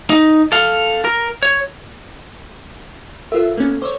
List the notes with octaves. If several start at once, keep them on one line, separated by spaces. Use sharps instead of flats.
D#4
A4 F5
A#4
C#5
F4 A4 A#4 C5 E5
A#3 B3 C#4
C5 C#5 D6 E6